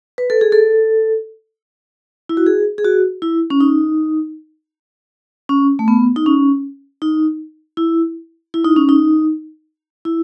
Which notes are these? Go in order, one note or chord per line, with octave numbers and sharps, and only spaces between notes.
B4
A4
G#4
A4
E4
F#4
G#4
G#4
F#4
E4
C#4
D#4
C#4
A3
B3
D#4
C#4
D#4
E4
E4
D#4
C#4
D#4
E4